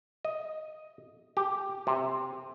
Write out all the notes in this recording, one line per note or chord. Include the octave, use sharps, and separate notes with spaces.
D#5
G4
C3